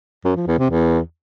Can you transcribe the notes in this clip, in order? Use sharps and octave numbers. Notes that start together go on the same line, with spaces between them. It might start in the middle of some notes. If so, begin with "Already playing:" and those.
F#2
F3
E2
C3
E2